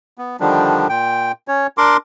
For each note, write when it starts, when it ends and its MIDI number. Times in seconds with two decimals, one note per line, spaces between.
0.18 0.37 59
0.40 0.88 50
0.40 0.88 51
0.40 0.88 53
0.40 0.88 55
0.40 0.88 62
0.89 1.32 46
0.89 1.32 79
1.48 1.67 61
1.48 1.67 73
1.78 1.97 62
1.78 1.97 70
1.78 1.97 84
1.78 1.97 86